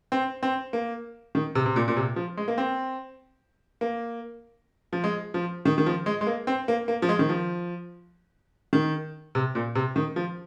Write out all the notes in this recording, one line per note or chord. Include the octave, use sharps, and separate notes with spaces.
C4
C4
A#3
D#3
C3
C3
A#2
A#2
C3
F3
G#3
A#3
C4
A#3
F3
G#3
F3
D#3
D#3
F3
G#3
G#3
A#3
C4
A#3
A#3
F3
G#3
D#3
F3
D#3
C3
A#2
C3
D#3
F3